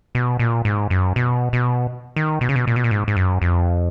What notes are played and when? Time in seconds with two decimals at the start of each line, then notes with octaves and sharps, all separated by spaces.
0.15 B2
0.39 A#2
0.65 G#2
0.90 F#2
1.16 B2
1.53 B2
2.16 D#3
2.41 B2
2.49 C#3
2.56 B2
2.67 A#2
2.76 B2
2.84 A#2
2.91 G#2
3.08 G#2
3.16 F#2
3.42 F2